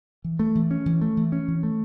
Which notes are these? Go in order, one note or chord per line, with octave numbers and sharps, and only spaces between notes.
E3
A3
E3
C#4
E3
A3
E3
C#4
E3
A3